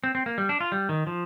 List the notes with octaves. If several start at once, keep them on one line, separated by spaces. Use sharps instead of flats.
C4
C4
A#3
G3
D4
F4
G3
D#3
F3